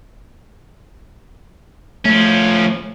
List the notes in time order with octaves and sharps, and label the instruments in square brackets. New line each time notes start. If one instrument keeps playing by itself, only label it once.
[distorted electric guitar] F3 C#4 [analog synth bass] A3